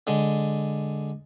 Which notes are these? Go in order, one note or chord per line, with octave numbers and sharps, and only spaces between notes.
D3 G#3